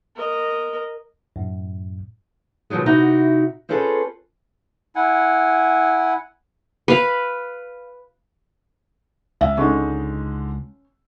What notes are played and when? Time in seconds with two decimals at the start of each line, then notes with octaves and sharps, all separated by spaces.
0.16 A#4 D#5
1.36 F#2 A2
2.70 B2 D#3 F3 F#3 G#3
2.86 C3 D#4 E4 F#4
3.69 C4 C#4 F4 G#4 A4 B4
4.96 E4 F#5 G#5
6.88 B4 F5
9.41 C#2 E5
9.57 D3 G#3 C#4 D#4